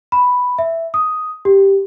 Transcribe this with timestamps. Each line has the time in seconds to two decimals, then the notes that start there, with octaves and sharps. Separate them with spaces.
0.12 B5
0.59 E5
0.94 D#6
1.45 G4